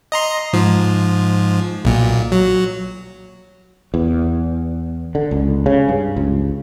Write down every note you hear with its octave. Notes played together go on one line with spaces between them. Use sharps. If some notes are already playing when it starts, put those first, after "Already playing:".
D#5 A#5 C6
G#2 F3
B1 A#2
F#3
E2
D3
C#2
C#3
G2
C#2